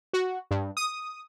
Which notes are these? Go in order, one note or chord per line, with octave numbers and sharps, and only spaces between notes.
F#4
G2
D#6